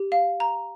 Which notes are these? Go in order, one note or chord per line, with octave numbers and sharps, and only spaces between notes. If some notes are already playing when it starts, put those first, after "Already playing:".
Already playing: G4
F5
A#5